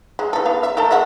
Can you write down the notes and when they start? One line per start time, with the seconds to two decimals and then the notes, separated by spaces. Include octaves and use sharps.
0.19 G#3
0.33 E3 A4
0.46 B3 F5
0.63 E5
0.77 A3 A4 A#4
0.91 G#3 E5 F#5